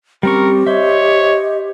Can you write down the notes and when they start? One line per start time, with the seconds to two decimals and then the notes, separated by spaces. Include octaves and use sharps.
0.23 G3 C4 C#4 G4 A#4 C#6
0.67 C5 C#5 D#5 E5